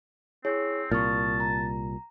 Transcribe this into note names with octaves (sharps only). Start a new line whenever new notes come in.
C4 E4 G#4 C#5
C2 A#2 A5 C#6 D#6 F6
A#5